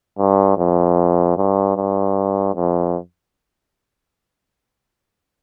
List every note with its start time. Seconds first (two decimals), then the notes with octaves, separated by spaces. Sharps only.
0.19 G2
0.58 F2
1.37 G2
1.77 G2
2.55 F2